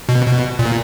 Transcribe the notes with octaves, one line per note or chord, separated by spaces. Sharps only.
B2
B2
A#2